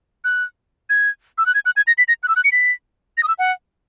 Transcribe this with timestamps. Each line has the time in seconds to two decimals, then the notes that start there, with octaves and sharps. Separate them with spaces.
0.24 F#6
0.90 G#6
1.38 E6
1.46 F#6
1.55 G#6
1.66 F#6
1.77 G#6
1.87 A#6
1.98 B6
2.08 A#6
2.23 F#6
2.28 E6
2.36 F#6
2.44 C#7
2.52 B6
3.17 A#6
3.23 D#6
3.28 E6
3.39 F#5